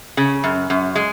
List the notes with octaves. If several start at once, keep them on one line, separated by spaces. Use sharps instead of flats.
C#3
F#2
F#2
G#3